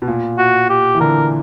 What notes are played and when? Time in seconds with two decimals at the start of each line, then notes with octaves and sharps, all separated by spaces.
0.02 B2
0.08 A#2
0.38 F#4
0.70 G4
0.95 E3
1.00 D3 A#4